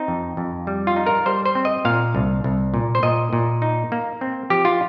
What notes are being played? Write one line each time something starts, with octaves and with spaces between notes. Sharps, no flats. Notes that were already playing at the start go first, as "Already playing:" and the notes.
Already playing: C4 D#4
F2
F2
G3
F4
D#4
A#4
G3 C5
C5
C4
D#5
A#2 F5
C2
C2
A#2
C5
A#2 D#5
A#2
D#4
A#3
C4
F3 G4
F4